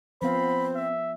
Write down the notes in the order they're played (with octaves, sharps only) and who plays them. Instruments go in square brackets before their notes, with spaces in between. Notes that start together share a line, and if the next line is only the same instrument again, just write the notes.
[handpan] F3 B3 F5 [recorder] C4 [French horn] C5 [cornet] B5
[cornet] E5